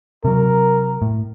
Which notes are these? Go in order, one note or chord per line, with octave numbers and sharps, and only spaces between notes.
C3 F#3 A#4
A2